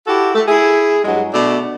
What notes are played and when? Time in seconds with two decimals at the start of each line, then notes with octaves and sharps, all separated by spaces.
0.07 E4 F#4 G4 A4
0.35 A3
0.48 E4 G#4
1.05 G2 F#3 G#3
1.33 B2 A3 D4